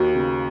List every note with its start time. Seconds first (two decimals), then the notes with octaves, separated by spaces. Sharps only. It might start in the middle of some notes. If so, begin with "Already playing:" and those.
Already playing: D#2 F#4
0.15 C#3